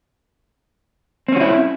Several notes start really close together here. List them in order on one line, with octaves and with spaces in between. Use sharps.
C4 C#4 F#4 E4